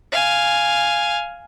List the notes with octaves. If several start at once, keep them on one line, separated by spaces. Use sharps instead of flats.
F5 G#5